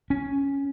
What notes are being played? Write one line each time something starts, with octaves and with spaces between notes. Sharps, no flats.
C#4